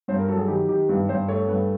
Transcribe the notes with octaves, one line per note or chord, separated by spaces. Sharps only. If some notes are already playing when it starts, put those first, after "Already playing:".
G2 C5
A#4
F#3 A4
G#4
D#3 G4
D#3 G4
G2 B4
G2 C5
A3 C#5
G2 B4